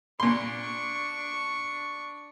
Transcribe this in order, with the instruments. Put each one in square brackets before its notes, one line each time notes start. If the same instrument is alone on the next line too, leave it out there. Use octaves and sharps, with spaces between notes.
[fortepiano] A#2 C6 [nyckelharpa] D4 C#6